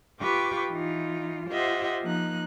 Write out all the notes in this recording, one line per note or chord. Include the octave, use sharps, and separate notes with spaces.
F4 G4 B4 G5 C#6 D6
E3 D#4 F4
F4 G4 C5 D#5 E5 F#5
F3 A#3 D#4 F#6